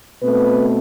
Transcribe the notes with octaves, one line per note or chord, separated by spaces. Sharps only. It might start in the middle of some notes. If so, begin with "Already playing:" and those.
B2 A3 C4 B4